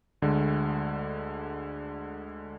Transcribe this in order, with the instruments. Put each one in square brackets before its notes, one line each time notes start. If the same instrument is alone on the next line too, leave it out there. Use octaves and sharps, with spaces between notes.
[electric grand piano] D2 D3 G#3